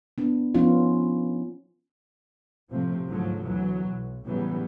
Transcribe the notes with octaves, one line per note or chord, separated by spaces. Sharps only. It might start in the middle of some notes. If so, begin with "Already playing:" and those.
B3 D4
F3 B3 C#4 D#4 F4
A1 C3 F3 A3 C4
D2 G#2 F3 F#3 A3
D2 B2 E3 F#3
B1
A2 C#3 E3 F#3 G3 B3